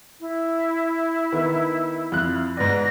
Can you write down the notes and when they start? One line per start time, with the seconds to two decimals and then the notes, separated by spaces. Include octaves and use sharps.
0.20 E4
1.32 D#3 B3
2.12 F2 F#6
2.57 G#2 B3 D5 A#6